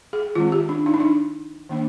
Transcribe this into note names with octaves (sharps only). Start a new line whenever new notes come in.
G#4
D#3 G#3 C4 F4
G4
D4
D#4
D4
D#4
D#3 A#3 D4